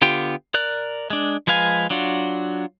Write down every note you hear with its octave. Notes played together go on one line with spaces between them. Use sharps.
D3 B3 F4 G4 G5
A#4 D5 F#6
G#3 D4
F3 G#3 B4 F5 G#5
F#3 D4 F4 F#4